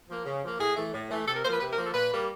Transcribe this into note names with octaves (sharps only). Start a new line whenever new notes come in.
F3 A#3
C#3
F3 A#3
A2 G#4
E3 A3
A2
E3 A3
C3 A4
A#4
F3 A#3 B4 C5
C3 B4
A#4
F3 A#3
A4
A#2 B4
G3 A#3